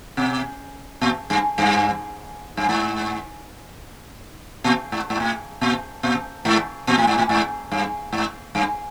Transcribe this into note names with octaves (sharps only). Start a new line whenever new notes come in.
B2
A#2
G2
G2
G2
G#2
A#2
G#2
G#2
A2
A#2
A#2
G#2
A#2
A2
G#2
A2
G#2
G2
G#2
G2